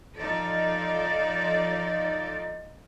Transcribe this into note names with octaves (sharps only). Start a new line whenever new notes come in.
F3 D#4 F4 A4 D5